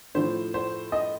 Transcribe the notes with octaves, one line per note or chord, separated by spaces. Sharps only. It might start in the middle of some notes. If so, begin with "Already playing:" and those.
A2 F3 C5
C5
D#5